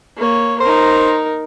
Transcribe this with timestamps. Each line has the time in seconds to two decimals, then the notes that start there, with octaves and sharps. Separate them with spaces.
0.17 A#3 C#5
0.61 D#4 A#4 C5